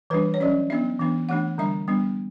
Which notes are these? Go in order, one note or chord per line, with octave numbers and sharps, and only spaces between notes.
E3 G3 D4 B4
C#5
F#3 C#4 D5
F#3 B3 D4 E5
E3 B3 D4
E3 A3 D4 F#5
D3 G3 D4 E5
G3 B3 D4